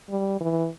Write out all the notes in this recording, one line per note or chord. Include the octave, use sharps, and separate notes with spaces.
G3
E3